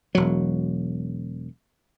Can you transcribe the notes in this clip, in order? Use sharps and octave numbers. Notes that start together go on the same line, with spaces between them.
E1 F#3